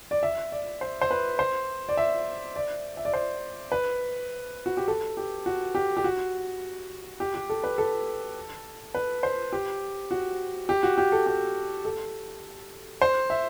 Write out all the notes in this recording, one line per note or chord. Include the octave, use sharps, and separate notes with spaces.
D5
E5
D5
C5
C5
B4
C5
D5
E5
D5
E5
D5
C5
B4
F#4
G4
A4
G4
F#4
G4
G4
F#4
G4
G4
A4
B4
A4
B4
C5
G4
F#4
G4
F#4
G4
A4
G4
A4
C5
E5